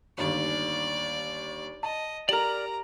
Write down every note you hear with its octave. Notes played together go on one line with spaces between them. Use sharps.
G1 D#2 D5
D#5 A5
G4 A#4 D5 A#5 F6